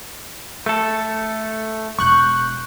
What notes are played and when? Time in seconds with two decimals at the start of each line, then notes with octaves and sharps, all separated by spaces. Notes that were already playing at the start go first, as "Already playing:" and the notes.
0.66 A3 A4
1.99 E1 C#6 F#6 G6